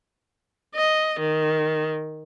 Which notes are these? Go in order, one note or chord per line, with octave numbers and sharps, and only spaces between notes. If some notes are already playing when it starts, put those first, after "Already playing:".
D#5
D#3